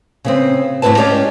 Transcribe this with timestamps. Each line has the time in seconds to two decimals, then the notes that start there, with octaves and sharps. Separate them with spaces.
0.25 C#3 B3 C4
0.82 D#2 G#2 A3 E4 B4 A5
0.97 G#3 C#4 G4 C#5 D5